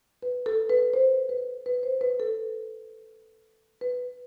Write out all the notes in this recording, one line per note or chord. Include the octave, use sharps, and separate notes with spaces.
B4
A4
B4
C5
B4
B4
C5
B4
A4
B4